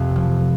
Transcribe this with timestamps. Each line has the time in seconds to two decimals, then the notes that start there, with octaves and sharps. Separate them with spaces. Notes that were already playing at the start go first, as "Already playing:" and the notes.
Already playing: F2 C3
0.16 F3